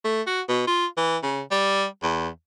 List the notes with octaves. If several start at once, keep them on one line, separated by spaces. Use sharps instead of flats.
A3
F#4
B2
F4
E3
C#3
G3
E2